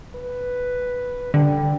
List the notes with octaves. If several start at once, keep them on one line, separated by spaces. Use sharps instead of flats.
B4
D3 G3